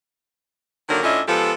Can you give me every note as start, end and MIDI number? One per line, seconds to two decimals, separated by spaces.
0.89 1.03 50
0.89 1.03 51
0.89 1.03 54
0.89 1.03 58
0.89 1.03 62
0.89 1.03 70
1.03 1.21 45
1.03 1.21 61
1.03 1.21 62
1.03 1.21 65
1.03 1.21 75
1.03 1.21 76
1.27 1.52 53
1.27 1.52 56
1.27 1.52 59
1.27 1.52 67
1.27 1.52 69